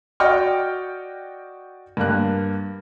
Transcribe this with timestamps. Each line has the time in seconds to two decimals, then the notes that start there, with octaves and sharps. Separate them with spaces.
0.20 F#4 D5 D#5 G5 C#6 F6
1.97 G2 A#3 F#6